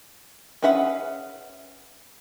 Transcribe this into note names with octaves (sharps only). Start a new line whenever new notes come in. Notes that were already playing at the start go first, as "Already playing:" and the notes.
C#4 G#4 B4 E5 F#5